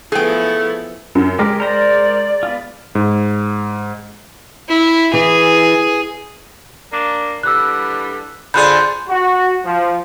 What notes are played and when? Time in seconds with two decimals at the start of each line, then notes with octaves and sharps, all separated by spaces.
0.12 F3 A3 B3 E4 G#4 G5
1.15 F#2
1.39 G#3 G4 A#4
1.60 A#4 C5 D5 A#5
2.43 B3 F4
2.95 G#2
4.68 E4
5.14 E3 G#4
6.93 A#3 D4
7.43 D3 E3 G3 E6 F#6
8.54 D3 F3 G#4 B5 C6 F#6 G6
9.08 F#4
9.64 F3